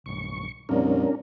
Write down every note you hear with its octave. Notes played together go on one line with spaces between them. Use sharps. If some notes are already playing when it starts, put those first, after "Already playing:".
B1 G2 C#6
C2 F2 A#2 C#4 D4 A#4